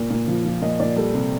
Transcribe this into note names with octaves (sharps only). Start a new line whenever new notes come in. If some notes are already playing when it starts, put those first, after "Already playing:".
Already playing: A#2
A#2
F3
F3
A#2 D#5
A#2 D5
G3 A4
C3